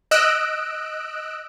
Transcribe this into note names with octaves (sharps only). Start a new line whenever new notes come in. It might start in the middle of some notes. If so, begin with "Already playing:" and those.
D#5 E6 F#6 D7